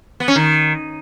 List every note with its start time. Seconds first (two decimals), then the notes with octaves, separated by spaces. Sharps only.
0.20 B3
0.28 C#4
0.36 D#3